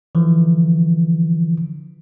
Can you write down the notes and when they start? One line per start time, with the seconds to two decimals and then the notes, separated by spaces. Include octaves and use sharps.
0.15 D3 E3 F3